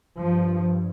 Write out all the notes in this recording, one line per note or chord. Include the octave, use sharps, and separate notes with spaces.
G2 F3